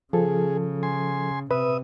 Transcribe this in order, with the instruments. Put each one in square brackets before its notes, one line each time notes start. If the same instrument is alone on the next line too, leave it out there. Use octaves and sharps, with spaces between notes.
[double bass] C#3 [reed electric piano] F3 A4 [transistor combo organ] G#4
[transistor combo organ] G#5 C6
[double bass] C3 [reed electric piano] B4 [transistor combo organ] E5 D#6